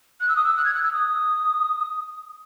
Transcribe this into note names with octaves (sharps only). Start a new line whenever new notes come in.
F#6
E6
D#6
E6
F#6
G#6
F#6
E6
D#6